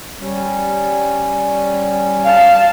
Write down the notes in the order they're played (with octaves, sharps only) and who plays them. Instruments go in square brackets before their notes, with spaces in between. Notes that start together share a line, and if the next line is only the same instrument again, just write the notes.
[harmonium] G3 C#4
[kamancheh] F5 A5